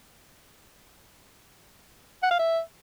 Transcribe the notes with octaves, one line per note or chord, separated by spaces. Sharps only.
F#5
F5
E5